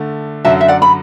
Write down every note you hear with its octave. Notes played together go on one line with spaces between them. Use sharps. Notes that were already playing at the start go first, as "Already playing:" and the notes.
Already playing: D3 A3
F#2 D3 F#3 E5 A5
E5
D5 F#5
B5